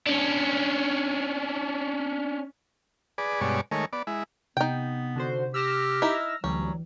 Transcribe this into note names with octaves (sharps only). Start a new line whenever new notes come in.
C#4 D4
G#4 B4 D5
G2 B2 G#3 C#5 D5
D#3 G#3 A3 A#4 C#5
B3 D5
G#3 E4
C3 B3 D#4 G5
D3 F#4 C5
G4 E6 F6 A#6
D#4 E4
D2 E3 F#3 G3 C#4